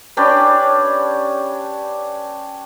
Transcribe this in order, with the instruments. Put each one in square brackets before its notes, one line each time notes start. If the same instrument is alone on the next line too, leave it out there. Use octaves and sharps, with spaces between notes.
[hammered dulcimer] C#4 D4 G4 B4